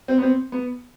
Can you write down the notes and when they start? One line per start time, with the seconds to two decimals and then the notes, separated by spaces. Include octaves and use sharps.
0.08 C4
0.18 B3
0.22 C4
0.52 B3